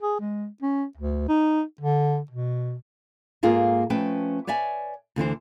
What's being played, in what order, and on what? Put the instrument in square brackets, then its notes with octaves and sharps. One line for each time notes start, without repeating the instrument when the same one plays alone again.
[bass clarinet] G#4
G#3
C#4
D2
D#4
D3
B2
[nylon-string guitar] G#2 A#3 F4 G#4 A4
F3 A3 C#4 B4 G5
B4 C#5 D5 E5 G#5
D2 D3 E3 C5